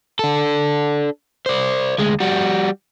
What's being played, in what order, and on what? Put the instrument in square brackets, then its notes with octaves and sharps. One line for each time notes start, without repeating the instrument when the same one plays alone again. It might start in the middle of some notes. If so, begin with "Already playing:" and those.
[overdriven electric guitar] D4 A4
C5 D5
D2 G#3
G3 F#4